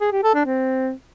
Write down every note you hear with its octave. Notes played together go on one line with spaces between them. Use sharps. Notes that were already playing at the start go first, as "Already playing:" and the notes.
G#4
G4
A4
D4
C4